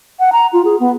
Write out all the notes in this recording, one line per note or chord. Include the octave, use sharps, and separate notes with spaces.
F#5
A#5
F4
G#4
B3